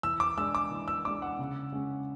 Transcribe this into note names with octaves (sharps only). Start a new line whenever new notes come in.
E3 E6
D6
G#3 D4 E6
D6
E3
E6
G#3 D4 D6
F#5
C#3
G#3 C#4